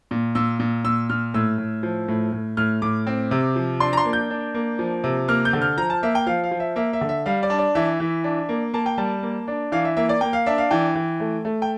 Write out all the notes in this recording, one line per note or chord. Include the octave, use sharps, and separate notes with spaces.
A#2
A#2 E6
A#2
A#2 E6
A#2 F6
A2 E6
A2
F3
A2
A2
A2 F6
A2 D6
C4
C3
F3
D4 C6
A#5
C6
A#3
G6
D4
A#3
F3
C3
A#3 F6
G6
D3
F6
F3 A#5
A5
A#3 E5
G5
F3 F5
F5
F3
E5
A#3 E5
E5
D3
E5
G3 F5
D5
D4
D5
E3 E5
E3
D4
A#3
A#3 A5
G5
G3 A5
A#3
D4
E3 F5
E5
A#3 E5
D5
A#3 G5
F5
D4 E5
F5
E3 G5
E3
A3
A3
G5